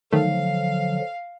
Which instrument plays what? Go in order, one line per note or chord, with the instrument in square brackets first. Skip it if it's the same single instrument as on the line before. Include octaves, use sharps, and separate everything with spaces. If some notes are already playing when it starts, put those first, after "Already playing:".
[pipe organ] D3 F3 F#3 [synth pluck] D#3 A3 [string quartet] F5